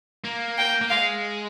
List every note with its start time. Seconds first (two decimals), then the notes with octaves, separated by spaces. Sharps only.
0.24 A#3
0.58 G5
0.81 A#3
0.90 G#3 F5